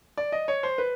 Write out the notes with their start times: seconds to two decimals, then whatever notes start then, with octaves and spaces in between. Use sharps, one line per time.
0.18 D5
0.32 D#5
0.48 C#5
0.63 C5
0.78 B4